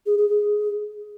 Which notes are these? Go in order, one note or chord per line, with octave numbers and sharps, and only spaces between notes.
G#4
G#4
G#4